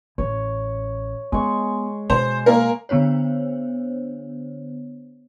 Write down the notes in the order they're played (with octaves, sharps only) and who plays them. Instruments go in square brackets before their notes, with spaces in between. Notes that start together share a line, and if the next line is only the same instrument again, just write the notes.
[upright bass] A1 [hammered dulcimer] C#5
[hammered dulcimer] G#3 C#6 [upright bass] B3
[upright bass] B2 [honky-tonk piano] C5
[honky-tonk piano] A#3 A#4
[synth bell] D3 B3 D4 C5 C#5